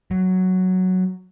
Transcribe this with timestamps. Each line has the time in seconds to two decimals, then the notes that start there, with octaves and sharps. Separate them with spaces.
0.11 F#3